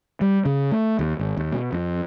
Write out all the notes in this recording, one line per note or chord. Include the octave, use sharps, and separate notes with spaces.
G3
C#3
A3
D#2
G#1
D#2
B2
F2